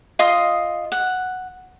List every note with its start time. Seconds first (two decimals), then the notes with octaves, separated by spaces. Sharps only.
0.19 F4 D#5 C6 D#6
0.92 F#5